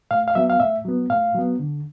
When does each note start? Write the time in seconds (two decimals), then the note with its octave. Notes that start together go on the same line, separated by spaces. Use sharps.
0.11 A2 F5
0.28 F5
0.35 F#3 B3 E5
0.50 F5
0.60 A2 E5
0.85 F#3 B3
1.10 A2 F5
1.35 F#3 B3
1.59 D3